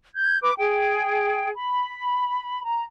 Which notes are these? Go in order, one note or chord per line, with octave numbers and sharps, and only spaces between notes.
G6 G#6
B4 D6
G#4 G5
B5
A#5